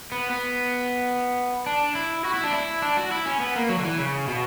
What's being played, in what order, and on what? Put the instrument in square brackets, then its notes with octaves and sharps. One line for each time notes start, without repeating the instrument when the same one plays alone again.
[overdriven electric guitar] B3
B3
D4
E4
F#4
E4
D4
E4
D4
F#4
E4
C#4
B3
A#3
F#3
D3
E3
C#3
B2